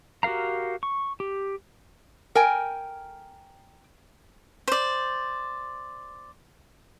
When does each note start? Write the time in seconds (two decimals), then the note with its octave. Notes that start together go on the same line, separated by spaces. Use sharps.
0.23 F#4 G4 A#4 F5 A#5
0.83 C#6
1.20 G4
2.35 A#4 G5 G#5
4.68 C5 D5